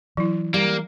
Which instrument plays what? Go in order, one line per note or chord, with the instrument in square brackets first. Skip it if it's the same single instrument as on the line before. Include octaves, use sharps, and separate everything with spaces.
[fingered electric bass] E3 [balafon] F#3 E4
[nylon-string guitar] G3 [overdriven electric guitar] A#3